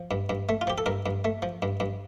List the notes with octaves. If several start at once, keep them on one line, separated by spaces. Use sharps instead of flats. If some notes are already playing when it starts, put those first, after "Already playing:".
Already playing: F3
G2
G2
A3
F4
F3 G4
A4
G2 A#4
G2
A3
F3
G2
G2